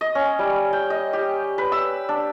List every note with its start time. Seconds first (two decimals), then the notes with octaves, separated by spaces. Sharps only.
0.01 D#5
0.15 C#4
0.39 G3
0.73 G5
0.90 D#5
1.13 G4
1.58 B4
1.72 E6
2.09 D4